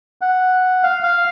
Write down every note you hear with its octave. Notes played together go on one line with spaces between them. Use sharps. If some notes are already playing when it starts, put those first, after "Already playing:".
F#5
F5
F5